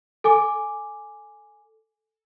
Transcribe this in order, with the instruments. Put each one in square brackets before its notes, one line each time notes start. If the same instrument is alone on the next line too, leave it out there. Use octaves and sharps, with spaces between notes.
[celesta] A4 G#5 D6